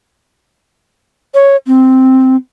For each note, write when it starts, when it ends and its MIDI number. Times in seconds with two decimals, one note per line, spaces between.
1.34 1.56 73
1.67 2.36 60